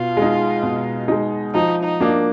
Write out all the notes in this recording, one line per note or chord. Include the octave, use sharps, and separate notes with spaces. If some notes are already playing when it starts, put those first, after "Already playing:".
Already playing: B2 F4
G#3
D#4
B2
G#3 D#4
F3 D#4
D#4
A#3 D4